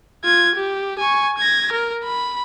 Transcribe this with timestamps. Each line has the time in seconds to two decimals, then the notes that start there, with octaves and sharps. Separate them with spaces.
0.24 F4 G#6
0.55 G4
0.99 G#5 C#6
1.37 G#6 A#6
1.72 A#4
2.05 B5